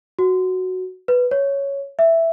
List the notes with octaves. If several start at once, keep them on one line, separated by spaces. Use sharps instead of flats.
F#4
B4
C#5
E5